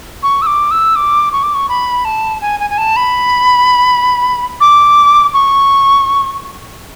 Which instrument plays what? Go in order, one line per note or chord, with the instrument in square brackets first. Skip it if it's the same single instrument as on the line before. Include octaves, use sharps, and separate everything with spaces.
[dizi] C#6
E6
D6
E6
D6
C#6
D6
C#6
B5
A5
G#5
G#5
G#5
A5
B5
D6
C#6